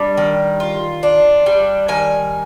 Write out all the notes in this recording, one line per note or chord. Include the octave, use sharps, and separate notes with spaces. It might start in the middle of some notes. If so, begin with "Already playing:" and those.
Already playing: G3 D4
D#3
F4
D4
G3
D#3 G#5